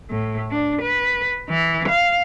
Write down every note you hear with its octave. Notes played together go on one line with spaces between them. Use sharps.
A2
D4
B4
E3
F5